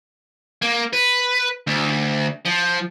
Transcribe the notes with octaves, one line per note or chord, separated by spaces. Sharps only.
A#3
B4
D2
F3